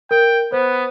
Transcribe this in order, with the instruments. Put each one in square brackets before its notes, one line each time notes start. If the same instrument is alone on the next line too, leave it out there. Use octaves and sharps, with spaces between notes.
[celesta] A#4 [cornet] G5
[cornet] B3 [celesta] C5